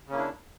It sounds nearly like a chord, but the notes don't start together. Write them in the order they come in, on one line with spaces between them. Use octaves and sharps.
C#3 C#4 A#3 E4 D4